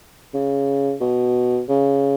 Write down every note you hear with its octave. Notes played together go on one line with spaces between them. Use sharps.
C#3
B2
C#3